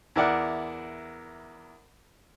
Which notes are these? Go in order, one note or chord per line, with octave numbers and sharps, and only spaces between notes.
E2 E4 A#4 D5 F#5